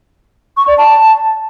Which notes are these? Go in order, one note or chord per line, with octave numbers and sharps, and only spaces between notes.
C#6
D5
A5